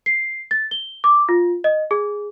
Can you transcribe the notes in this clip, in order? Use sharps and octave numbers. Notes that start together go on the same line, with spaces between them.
C7
A6
G7
D6
F4
D#5
G#4